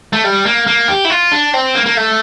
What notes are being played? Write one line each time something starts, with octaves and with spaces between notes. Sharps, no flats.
A3
G3
A#3
A#3
G4
E4
F4
D4
C4
A#3
A#3
A3